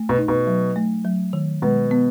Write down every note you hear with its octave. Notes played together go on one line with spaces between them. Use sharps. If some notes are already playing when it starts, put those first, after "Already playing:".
Already playing: A3
B2
D#4
B2
F#3
A3
F#3
D#3
B2 G#3
B3